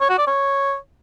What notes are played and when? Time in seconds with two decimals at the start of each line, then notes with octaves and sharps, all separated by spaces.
0.01 C#5
0.10 F#4
0.18 D5
0.27 C#5